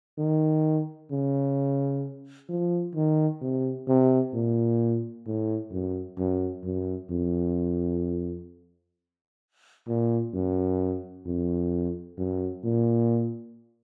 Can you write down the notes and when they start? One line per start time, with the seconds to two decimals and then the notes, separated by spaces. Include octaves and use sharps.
0.18 D#3
1.11 C#3
2.49 F3
2.95 D#3
3.41 C3
3.88 C3
4.34 A#2
5.26 A2
5.72 F#2
6.18 F#2
6.64 F#2
7.10 F2
9.87 A#2
10.34 F#2
11.26 F2
12.18 F#2
12.64 A#2